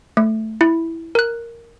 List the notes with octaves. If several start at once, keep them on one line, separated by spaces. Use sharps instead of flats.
A3
E4
A#4 F#6